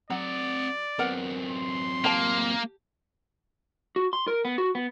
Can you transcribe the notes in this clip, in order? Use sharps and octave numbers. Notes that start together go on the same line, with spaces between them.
F#3 C4 D5 F#5
F#2 B3 C4 A#4 F#5
C6
A#3 G4 A5
F#4
C6
A#4
B3
F#4
B3